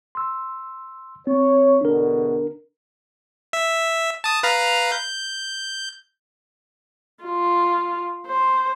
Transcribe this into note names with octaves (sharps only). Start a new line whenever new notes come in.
C6 E6
C4 C#5
E2 B2 D3 D4 A#4
E5
A5 D#6
B4 F5 A#5
G6
F4
C5